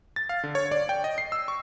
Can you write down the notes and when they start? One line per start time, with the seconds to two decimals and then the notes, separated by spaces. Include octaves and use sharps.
0.16 A6
0.29 F5
0.44 D3
0.55 C#5
0.72 D5
0.89 G5
1.04 D#5
1.18 C7
1.32 E6
1.48 C#6